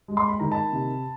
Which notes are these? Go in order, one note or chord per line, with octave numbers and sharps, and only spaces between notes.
G#3
C6
B5
D#3 A#5
A5 B5
C3